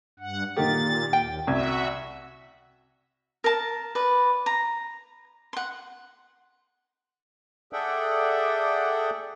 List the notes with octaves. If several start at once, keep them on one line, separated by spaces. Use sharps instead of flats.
G2 F#5
A#2 D#3 A#3 G4 A6
D#2 G5
C2 F#4 E5 G#6
A#4 A5
B4 D5
A#5
F#5 C6
G#4 A4 D5 E5 F#5 G5